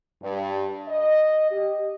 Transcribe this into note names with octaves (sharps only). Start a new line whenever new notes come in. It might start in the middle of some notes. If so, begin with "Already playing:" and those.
G2
D#5
G4